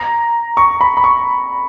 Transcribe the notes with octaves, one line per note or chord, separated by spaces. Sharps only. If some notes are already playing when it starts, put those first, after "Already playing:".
Already playing: A#5
C#6
B5
B5
C#6